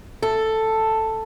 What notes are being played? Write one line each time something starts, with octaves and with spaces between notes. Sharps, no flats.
A4